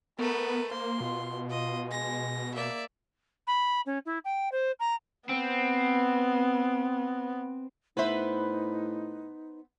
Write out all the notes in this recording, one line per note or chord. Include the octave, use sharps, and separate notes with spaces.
A3 B3 A#4 B4
A#3 C5 C6
B2 F4
F4 D#5
G#3 A#6
A#3 D5 E5
B5
C#4
E4
G5
C5
A#5
B3 C4
A2 B3 D#4 B4 C5 E5